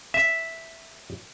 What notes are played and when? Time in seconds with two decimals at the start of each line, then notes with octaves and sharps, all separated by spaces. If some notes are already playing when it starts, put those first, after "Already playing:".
0.14 E5